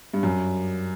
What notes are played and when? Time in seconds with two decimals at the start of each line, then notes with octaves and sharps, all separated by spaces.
0.14 G2
0.23 F#2